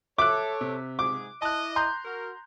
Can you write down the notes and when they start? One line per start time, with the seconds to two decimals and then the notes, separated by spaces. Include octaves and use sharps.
0.18 A4 C#5 E5 D6 F#6
0.61 C3
0.99 G#2 G#4 D6
1.42 E4 D#5 A5 F#6
1.76 A#5 C6 G6
2.05 F#4 A#4